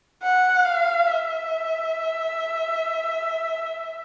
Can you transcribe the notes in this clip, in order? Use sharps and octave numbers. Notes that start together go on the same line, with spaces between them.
F#5
F5
E5